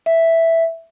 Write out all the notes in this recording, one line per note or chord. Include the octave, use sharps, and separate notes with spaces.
E5